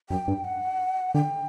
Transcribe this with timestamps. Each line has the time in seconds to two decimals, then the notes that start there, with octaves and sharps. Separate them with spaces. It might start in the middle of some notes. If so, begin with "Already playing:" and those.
0.10 F#2 G5
0.28 G2
0.44 F#5
1.14 D3 G5